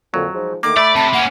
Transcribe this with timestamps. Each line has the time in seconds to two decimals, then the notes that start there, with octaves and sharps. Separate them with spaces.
0.14 F2 A#2 D3 F#3
0.34 F3 G#3 D#4
0.63 D3 D#3 A3 A#3 D6
0.77 A3 D5 E5 B5
0.96 C3 A5
1.14 A#3 C#4 F#5